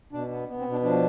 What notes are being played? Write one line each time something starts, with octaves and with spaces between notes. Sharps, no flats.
B2 D4
B3
B3
C4
B2
D4
F3 D4